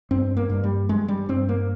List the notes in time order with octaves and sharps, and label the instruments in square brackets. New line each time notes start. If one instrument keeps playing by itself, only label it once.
[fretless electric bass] G2 C4
A#3
G2
G3
G2 G#3
G3
G2 C4
A#3